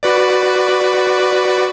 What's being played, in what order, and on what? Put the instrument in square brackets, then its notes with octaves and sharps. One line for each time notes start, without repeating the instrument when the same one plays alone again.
[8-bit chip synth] F#4 B4 D5